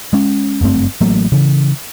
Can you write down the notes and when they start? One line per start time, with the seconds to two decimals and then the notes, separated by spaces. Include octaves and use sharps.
0.13 G#3 C#4
0.61 F#1 G2 A3 C4
1.01 A1 F#3 A3 A#3
1.32 C#3 E3